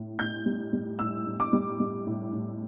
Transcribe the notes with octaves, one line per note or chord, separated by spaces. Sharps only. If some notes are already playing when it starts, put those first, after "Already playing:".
Already playing: A2
A2 G6
G3
G3
A2 E6
A2
D6
G3
G3
A2
A2